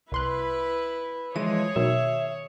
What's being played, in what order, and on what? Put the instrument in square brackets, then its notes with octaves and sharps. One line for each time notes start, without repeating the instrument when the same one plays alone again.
[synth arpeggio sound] C2 C6 F#6 [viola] E4 B4
[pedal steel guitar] E3 F3 G#3 [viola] G#4 C#5 [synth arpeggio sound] D#7
[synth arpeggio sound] B2 D#3 F#3 [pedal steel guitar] E5